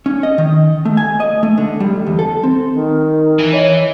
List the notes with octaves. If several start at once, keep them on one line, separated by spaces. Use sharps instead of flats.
C#4
D#5
D#3
A3
G#5
D#5
A3
D3
G3
E2
A4
C4
D#3
E3 G#5
C#5 D#5